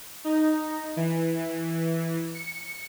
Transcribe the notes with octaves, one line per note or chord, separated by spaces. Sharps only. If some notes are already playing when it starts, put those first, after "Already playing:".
D#4
E3
C#7